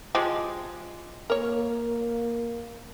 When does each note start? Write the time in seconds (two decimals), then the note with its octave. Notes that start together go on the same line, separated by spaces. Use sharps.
0.15 F3 G#3 G4
1.30 A#3 A#4 C#5